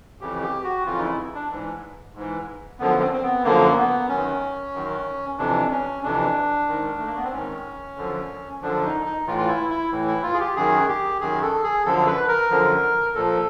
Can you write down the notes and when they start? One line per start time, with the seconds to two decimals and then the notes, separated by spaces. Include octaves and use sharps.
0.21 F2 C#3 E3 G4
0.43 G4
0.64 F#4
0.85 F2 C#3 E3 F4
0.98 D#4
1.02 E4
1.34 D4
1.50 G#2 E3
2.15 G#2 E3
2.79 F#2 D3 F3 B3
3.01 C4
3.13 C4
3.23 B3
3.44 F#2 D3 F3 A#3
3.77 B3
4.09 F#2 D#3 C#4
4.74 F#2 D#3
5.38 F2 C3 E3 D4
5.71 C#4
6.03 F2 C3 E3 D4
6.68 G#2 D#3
6.98 A3
7.07 A#3
7.16 B3
7.24 C4
7.32 G#2 D#3 C#4
7.97 F#2 D3 F3
8.62 F#2 D3 F3 D4
8.83 D#4
9.05 D#4
9.27 A2 E3 F4
9.38 F4
9.48 E4
9.70 E4
9.91 A2 E3
10.07 E4
10.23 F4
10.34 G#4
10.40 G4
10.56 F#2 D#3 G#4
10.88 G4
11.21 F#2 D#3 G#4
11.42 A4
11.64 G#4
11.86 F#2 D3 F3 A4
12.07 B4
12.28 A#4
12.50 F#2 D3 F3
13.15 A#2 F3 A4